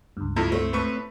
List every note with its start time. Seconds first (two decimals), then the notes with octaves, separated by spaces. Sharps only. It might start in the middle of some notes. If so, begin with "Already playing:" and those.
0.17 C#2 G2
0.36 F2 E4
0.52 A3 C4 C#5
0.73 A2 B4 C#6